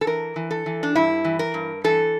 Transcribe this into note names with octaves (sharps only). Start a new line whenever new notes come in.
A4
E3 A#4
E3
A4
E3
D4
G2 E4
E3
A#4
G2
E3 A4